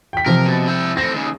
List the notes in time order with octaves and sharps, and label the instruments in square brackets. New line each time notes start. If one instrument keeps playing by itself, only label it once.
[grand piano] G5 B6
[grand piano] C3 F3 [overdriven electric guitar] A#4
[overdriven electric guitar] B2
E4 G5
[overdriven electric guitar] A2 C4 [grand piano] A#6
[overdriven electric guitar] D#2 C#3